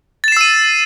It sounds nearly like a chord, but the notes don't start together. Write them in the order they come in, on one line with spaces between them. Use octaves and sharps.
A6 E7 C7 E6 D#7